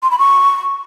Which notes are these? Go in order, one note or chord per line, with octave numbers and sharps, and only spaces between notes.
C6
B5
C#6